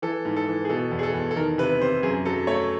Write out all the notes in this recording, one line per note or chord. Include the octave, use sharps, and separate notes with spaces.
E3 A4
G#2
A4
E3
G#4
B2 A4
E2
G#4
A4
E2
A4
D#3 A#4
C3 B4
C3 C5
F#2 G#4
F#3 A4
A3 C#5